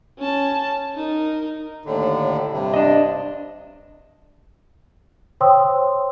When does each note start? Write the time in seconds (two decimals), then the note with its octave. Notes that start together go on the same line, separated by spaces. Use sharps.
0.19 C#4 A5
0.96 D#4 A#4
1.84 D#2 A2 D3
2.52 G2 C3
2.74 D4 D#5
5.41 C5 C#5 G5 C6 D#6 E6